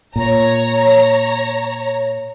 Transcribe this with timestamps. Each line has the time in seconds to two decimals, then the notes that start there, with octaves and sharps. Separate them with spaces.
0.16 A#2 C#5 A#5